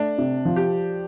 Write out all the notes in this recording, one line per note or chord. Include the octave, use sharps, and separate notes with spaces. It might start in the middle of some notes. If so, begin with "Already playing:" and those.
Already playing: A3 D4
C3
F3
G4